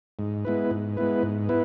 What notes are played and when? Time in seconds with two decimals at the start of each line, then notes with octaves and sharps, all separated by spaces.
0.19 G#2
0.45 G#3 B3 E4 B4
0.71 G#2
0.97 G#3 B3 E4 B4
1.23 G#2
1.49 B3 E4 B4